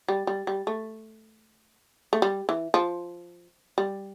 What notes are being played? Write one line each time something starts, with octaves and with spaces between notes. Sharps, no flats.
G3
G3
G3
A3
A3
G3
E3
F3
G3